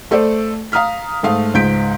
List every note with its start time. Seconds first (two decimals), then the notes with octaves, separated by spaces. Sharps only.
0.11 A3 A4 C5 D5
0.72 F5 A#5 D#6 F6 B6
1.23 G#2 A3 F5 D#6
1.54 C#2 G#2 G6 B6 D7